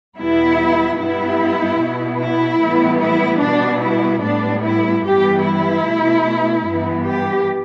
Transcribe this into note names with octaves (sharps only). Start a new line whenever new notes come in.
E2 B2 G3 B3 E4
G2 G3 B3 E4
B2 B3
E4
A2 E3 G3 B3
E4
B2 G3 B3 D4
E4
A2 G3 B3 D4
E4
G2 E3 G3 B3 G4
E4
B2 A3
G2 E3 B3
G4